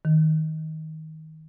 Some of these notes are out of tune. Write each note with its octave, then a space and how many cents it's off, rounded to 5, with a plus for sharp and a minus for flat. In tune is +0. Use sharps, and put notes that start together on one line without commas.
D#3 +20